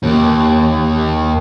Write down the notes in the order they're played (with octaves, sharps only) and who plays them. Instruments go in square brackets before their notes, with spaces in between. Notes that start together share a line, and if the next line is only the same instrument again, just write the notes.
[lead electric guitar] D#2